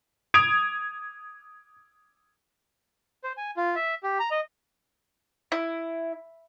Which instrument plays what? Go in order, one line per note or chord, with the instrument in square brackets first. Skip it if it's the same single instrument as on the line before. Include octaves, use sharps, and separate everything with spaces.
[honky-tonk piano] D#6 G#6 D7 F7
[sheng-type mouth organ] C5
G#5
F4
E5
G4
A#5
D#5
[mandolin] E4